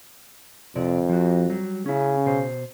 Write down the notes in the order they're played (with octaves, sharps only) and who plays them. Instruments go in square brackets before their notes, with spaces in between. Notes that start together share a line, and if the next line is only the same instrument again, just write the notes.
[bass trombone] F2 [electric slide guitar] C3 D5
[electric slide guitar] F3 F#4
F#3 G3
[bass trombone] C#3 [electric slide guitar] C#4 E4
[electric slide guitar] B2 C5